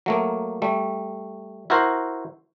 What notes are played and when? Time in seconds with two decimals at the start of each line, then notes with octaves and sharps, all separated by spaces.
0.06 F#3 A3 A#3
0.62 G3 A3
1.70 E4 F#4 A#4 C5